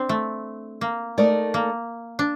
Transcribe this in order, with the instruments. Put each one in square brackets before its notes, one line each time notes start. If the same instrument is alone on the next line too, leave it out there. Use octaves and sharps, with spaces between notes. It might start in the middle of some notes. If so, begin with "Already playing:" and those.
Already playing: [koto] C4 D4
A3
A#3
[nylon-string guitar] A3 D#4 A#4 D5
[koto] A#3
D4